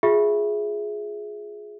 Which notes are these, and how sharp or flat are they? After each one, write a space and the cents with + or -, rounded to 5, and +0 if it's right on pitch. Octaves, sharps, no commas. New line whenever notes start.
F4 +25 G#4 +10 E5 +0